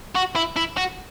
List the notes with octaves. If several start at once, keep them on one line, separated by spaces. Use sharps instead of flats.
F#4
E4
E4
F#4